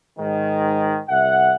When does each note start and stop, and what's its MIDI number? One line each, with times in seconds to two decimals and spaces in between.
0.18 1.01 44
0.18 1.01 51
1.09 1.54 36
1.09 1.54 76
1.09 1.54 78